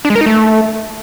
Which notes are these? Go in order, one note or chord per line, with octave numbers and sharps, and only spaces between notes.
D4
G#3
A#4
D#4
A3